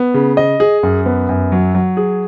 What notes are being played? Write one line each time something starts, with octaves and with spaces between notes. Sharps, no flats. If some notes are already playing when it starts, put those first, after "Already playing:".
Already playing: B3
C#3
D#5
G#4
F#2
B3
F#2
F#3
F#3
G#4